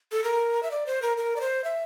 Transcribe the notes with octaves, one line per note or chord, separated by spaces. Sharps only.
A4
A#4
E5
D5
C5
A#4
A#4
D5
C5
E5